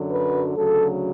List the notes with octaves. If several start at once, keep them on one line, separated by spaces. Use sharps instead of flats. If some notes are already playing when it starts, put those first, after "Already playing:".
Already playing: F#2 D3 F#3
B4
D2 C#3 F#3 A4